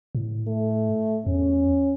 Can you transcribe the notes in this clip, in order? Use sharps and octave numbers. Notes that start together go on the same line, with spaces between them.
A2
A3
E2 C#4